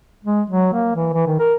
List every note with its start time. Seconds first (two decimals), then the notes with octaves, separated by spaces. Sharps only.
0.25 G#3
0.50 F#3
0.73 A#3
0.95 E3
1.13 E3
1.27 D#3
1.39 A#4